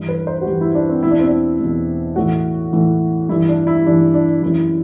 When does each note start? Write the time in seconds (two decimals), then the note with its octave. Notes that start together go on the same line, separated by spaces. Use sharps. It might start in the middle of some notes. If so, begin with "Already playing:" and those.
Already playing: G2 E3
0.08 B4
0.27 C5
0.42 F#4
0.46 G2 E3 G4
0.61 E4
0.75 D4
0.89 C4
1.03 E2 B2 E4
1.11 D4
1.19 C4
1.27 D4
1.60 E2 B2
2.16 A2 E3 F#4
2.73 A2 E3
3.29 G2 E4
3.32 E3
3.49 D4
3.67 E4
3.85 G2 E3 D4
4.14 D4
4.42 F#2 E3 E4